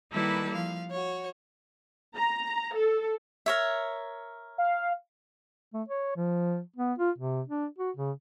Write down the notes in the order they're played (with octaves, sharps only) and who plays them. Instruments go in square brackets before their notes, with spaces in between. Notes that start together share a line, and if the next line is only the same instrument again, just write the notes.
[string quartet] D#3 G3 A#3 E4 A4 B4
F3 F5
F#4 C#5
[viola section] A#5
A4
[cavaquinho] A#4 C#5 E5
[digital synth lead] F5
[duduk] A3
C#5
F3
B3
F4
C3
D4
F#4
C#3